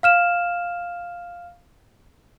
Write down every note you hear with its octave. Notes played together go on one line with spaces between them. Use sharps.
F5 F6 E7